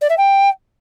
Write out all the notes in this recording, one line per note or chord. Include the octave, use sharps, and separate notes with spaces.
D5
E5
G5